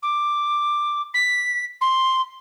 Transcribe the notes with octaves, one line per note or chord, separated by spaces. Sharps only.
D6
B6
C6